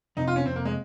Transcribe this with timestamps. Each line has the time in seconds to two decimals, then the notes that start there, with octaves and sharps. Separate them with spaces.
0.17 F2 C3 D#4
0.27 F4
0.36 C#4
0.46 F2 C3 C4
0.56 A#3
0.65 G#3